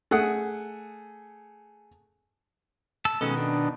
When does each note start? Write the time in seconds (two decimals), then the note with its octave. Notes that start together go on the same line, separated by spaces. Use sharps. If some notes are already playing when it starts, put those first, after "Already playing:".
0.11 A3 G#4 F#5 D#6
3.05 A5 E6
3.21 B2 D#3 G#3 C#4 A4
3.37 D4